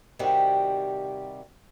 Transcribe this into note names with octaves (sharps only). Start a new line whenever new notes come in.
C3 D#3 G3 F#4 G4